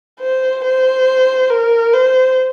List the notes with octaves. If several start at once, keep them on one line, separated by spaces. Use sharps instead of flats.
C5
C5
A#4
C5